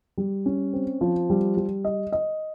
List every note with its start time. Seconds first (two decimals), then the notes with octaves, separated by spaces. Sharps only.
0.18 G3
0.46 C#4
0.73 C4
1.01 F3
1.30 G3
1.57 G3
1.85 D#5
2.12 D#5